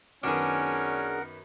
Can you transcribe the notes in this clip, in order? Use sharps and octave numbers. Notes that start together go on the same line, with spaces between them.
F#2 D#3 B3 C#4 D4 G#4 A#4 F#5